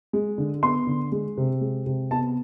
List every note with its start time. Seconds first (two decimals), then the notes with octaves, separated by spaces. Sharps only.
0.13 G#3
0.38 D3
0.63 B3 C6
0.87 D3
1.12 G#3
1.37 C3
1.61 G#3
1.86 C3
2.11 B3 A5